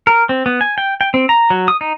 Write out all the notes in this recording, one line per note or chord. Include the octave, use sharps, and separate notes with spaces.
A#4
C4
B3
G#5
G5
G5
C4
A#5
F#3
D#6
D#4